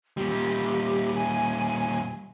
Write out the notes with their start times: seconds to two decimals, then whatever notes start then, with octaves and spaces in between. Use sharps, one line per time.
0.17 A#2 G3 G4
1.15 G#5